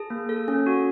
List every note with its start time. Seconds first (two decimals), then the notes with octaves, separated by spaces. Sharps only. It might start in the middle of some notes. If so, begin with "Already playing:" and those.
Already playing: G#4 A5
0.10 A#3
0.29 A4
0.48 C#4
0.67 F#4